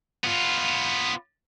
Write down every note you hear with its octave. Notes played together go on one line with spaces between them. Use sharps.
B3 F4